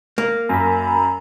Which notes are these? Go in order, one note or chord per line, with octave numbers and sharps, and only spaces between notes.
A#3
F#2 A#5 B5